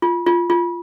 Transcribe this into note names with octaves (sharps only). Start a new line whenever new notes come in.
F4
F4
F4